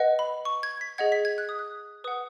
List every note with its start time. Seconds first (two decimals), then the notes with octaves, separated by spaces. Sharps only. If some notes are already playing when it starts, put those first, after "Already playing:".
Already playing: B4 D#5 F#5
0.19 B5
0.45 C#6
0.63 G#6
0.81 B6
0.98 G#4 D#5 F#5 G#6
1.12 B6
1.25 G#6
1.38 F#6
1.49 D#6
1.59 F#6
2.04 B4 F#5 D#6